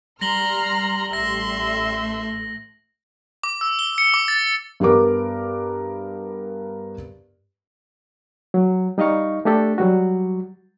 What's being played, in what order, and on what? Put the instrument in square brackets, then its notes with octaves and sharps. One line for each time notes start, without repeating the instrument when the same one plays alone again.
[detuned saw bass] G3 [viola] A#5 [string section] C6 F6 [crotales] A#6 F#7 G7
[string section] A1 A3 [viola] E5 C6 [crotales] A#6
[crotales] D6
E6
G7
C#7
D6
A6
[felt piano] G2 G3 B3 A#4 D6
[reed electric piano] F#3
G3 D#4 D#5 F5 C#6
A3 D4 G4 A4
F#3 G3 F#4